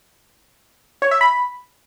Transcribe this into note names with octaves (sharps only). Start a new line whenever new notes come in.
C#5
E5
B5